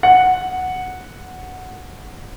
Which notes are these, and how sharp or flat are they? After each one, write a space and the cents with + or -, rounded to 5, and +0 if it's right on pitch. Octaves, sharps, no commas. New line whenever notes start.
F#5 -5